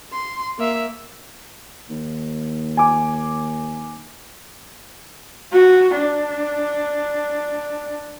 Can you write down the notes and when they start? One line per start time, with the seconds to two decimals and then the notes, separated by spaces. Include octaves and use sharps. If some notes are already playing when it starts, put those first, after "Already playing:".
0.13 C6
0.59 A#3 E5
1.90 D#2
2.77 G#5 D6
5.52 F#4
5.97 D4